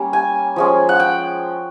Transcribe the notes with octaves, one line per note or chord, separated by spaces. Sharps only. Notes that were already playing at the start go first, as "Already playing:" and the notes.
Already playing: G3 A#3 C#4
G#5
F3 G#3 C#4
F#5
G5